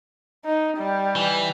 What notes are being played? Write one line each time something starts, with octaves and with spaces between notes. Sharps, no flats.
D#4
G3
E3